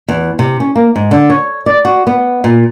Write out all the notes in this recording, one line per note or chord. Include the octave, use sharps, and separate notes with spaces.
E2
C3
C#4
A#3
G#2
D3
C#5
D5
F#4
B3
A#2